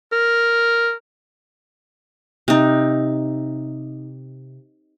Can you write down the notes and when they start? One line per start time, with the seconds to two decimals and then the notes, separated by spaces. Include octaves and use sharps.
0.12 A#4
2.48 C3 D#4